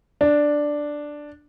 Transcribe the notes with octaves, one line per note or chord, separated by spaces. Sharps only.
D4